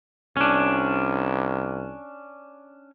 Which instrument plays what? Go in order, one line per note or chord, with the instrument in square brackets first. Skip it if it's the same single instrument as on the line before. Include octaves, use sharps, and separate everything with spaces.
[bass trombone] C2 [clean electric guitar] C#4 D4